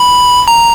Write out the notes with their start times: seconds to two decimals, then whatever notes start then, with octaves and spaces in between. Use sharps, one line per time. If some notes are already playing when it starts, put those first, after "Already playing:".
Already playing: B5
0.48 A#5